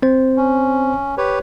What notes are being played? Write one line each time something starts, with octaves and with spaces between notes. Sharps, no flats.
C4 C5
C#4
G4 B4 C#5